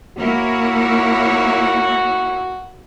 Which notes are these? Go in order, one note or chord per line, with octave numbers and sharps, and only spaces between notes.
A#3 E4 F#4 C#5